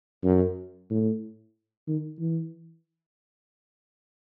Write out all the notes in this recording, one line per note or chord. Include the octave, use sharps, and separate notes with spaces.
F#2
A2
D#3
E3